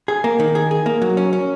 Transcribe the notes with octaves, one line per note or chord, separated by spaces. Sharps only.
G#4
A#3
D#3
G#4
G#4
A#3
F#3
C#4
C#4